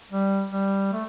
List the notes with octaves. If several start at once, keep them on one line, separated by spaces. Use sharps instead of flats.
G3
G3
A3